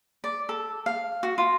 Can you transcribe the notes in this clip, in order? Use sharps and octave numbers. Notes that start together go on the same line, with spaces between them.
D5
A4
F5
F#4
F4